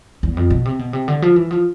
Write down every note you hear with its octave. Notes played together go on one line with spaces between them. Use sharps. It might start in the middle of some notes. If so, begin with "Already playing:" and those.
E2
F2
B2
C3
B2
C3
D3
F3
E3
F3